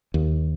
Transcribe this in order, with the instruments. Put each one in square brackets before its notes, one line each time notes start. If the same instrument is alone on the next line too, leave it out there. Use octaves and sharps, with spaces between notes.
[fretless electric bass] D#2